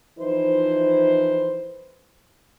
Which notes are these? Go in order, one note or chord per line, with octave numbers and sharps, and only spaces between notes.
E3 F3 D#4 E4 B4 C5